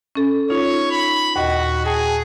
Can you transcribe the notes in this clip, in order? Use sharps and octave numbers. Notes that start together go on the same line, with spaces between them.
C#4 A4
D#4 F4 C#5
B5
D#2 A#2 F#4 D#5
G#4 G5 A5